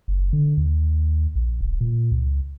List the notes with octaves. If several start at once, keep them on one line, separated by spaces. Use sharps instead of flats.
F#1
D3
D#2
A#1
D1
A#2
C#2